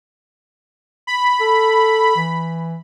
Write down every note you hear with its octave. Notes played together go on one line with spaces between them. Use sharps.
B5
A4
E3